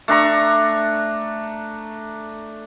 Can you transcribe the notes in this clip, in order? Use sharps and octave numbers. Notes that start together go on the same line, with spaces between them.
A3 D4 A#5 C#6